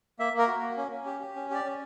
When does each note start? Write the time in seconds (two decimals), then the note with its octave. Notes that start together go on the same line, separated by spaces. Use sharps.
0.19 A#3 E5
0.33 A#3
0.38 A#4
0.47 F#4
0.62 A#3
0.77 C#4
0.92 C#4
1.06 G4
1.21 G4
1.35 C#4
1.50 G4 D5
1.65 C#4